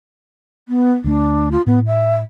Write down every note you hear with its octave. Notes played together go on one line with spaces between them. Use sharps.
B3
D2 A3 D4
F4
A2 B3
E5